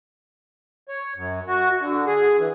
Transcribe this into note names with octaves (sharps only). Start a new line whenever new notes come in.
C#5
F#2
F#4
D3
G#4
E3